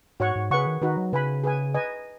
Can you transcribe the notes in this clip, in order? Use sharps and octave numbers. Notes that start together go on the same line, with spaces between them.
G#2 F#4 C#5 F#5 C#6
G#2
C#3 G#4 B4 F#5 C#6
D#3
D#3 D#4 F#4 B4
F#3
C#3 B4 G#5 B5
G#4 B4 G#5
B4 D#5 G#5